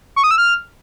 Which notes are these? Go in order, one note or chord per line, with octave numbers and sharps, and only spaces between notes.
C#6
D#6
E6
F6